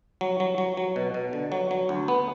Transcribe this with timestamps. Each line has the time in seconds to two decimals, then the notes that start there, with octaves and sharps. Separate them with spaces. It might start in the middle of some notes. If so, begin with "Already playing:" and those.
0.21 F#3
0.40 F#3
0.58 F#3
0.77 F#3
0.96 B2
1.14 B2
1.33 D3
1.52 F#3
1.71 F#3
1.89 D2
2.08 B3